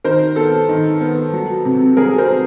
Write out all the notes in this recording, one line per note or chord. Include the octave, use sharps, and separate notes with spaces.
D#3 A#4 C5
B3 A4
D#3
B3
F#3
C3
F#3 G#4 A#4
A#4 C5
F#3